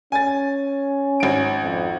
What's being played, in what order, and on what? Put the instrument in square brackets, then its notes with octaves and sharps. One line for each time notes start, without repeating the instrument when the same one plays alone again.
[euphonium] C#4 [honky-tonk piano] G#5 A6
[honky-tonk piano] G#1 D7
[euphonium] F2